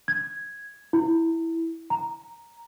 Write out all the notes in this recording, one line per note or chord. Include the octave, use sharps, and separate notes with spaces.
G#6
E4
A#5